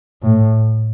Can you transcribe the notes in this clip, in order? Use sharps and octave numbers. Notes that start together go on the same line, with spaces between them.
A2